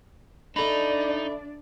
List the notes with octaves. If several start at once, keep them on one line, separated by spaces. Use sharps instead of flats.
A3 D4 D#4 D5 B5